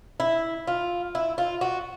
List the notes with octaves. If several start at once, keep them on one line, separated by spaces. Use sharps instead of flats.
E4
F4
E4
F4
F#4